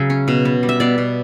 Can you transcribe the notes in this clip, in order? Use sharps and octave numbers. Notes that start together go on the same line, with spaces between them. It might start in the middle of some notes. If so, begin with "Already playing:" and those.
Already playing: C#3 F#3 E5
C#4
B2
B3
G3
E5
B2 D5
B2